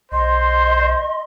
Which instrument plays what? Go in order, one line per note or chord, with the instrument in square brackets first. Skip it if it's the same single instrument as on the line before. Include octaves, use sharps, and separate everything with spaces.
[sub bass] B1 [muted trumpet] C5 [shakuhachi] D#5 [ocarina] C6